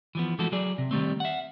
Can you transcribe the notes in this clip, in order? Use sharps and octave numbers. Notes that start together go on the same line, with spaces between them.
E3 F3 B3
E3 F3 G#3 A3 F#4 A4
F#3 G#4 D5
C3
D#3 G3 A3 C4
E5 F#5